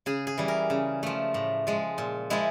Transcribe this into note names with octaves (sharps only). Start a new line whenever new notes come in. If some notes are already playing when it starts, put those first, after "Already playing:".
C#3 G#4
G#4
E3 G3
A#4
C#3
F3 A3
A2
F3 G#3
A#2
F3 G#3 E4